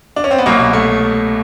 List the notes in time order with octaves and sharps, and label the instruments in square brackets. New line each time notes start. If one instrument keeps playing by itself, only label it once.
[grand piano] D4
C#4
C4
B3
C2 B2 F#3 A#3
A3